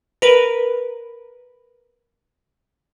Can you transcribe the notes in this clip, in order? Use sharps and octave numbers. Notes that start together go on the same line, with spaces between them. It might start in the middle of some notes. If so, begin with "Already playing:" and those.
A#4 B4